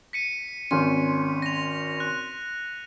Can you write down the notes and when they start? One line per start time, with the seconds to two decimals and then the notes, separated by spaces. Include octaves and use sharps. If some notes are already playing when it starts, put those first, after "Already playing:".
0.13 B6 C#7 D#7
0.71 G#1 C#4 C6
1.42 A#6 F7
2.00 F#6